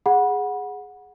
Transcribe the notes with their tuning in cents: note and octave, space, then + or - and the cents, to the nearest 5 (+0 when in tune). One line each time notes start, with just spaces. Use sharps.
G#4 +0 F#5 -15 B5 -25